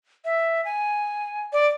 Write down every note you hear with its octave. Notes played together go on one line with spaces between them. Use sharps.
E5
G#5
D5